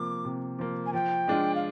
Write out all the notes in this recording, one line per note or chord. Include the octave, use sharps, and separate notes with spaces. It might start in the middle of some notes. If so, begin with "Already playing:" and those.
Already playing: C3 F3 A#3 D6
C3
F3 A#3
G#5
F3 G5
G#3 D4 F4
F5